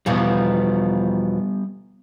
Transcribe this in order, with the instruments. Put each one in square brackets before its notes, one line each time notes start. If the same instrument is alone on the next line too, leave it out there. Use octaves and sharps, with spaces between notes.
[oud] E2 B2 F3 [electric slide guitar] G3 B3